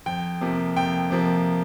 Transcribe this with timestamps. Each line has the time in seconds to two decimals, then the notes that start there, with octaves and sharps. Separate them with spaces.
0.06 F2 G5
0.41 C3 F3 A#3
0.76 F2 G5
1.10 C3 F3 A#3